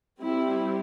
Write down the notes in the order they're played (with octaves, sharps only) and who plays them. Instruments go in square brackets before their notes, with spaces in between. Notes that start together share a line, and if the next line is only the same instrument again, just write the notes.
[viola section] G3 C4 E4